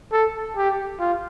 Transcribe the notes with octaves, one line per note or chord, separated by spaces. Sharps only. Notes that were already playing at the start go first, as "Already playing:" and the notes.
A4
G4
F4